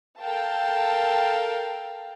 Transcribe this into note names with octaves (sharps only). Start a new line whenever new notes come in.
A4 A#4 F5 G5 A5